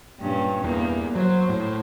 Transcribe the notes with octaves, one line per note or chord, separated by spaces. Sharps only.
G2 A#2 C#4
E2 E3 A#3
F#3 C5
A2